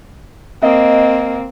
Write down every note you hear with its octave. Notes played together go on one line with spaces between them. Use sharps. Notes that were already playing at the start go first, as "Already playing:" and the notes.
A#3 C4 D#5